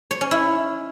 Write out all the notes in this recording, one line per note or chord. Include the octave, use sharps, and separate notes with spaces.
C#5
C#4
E4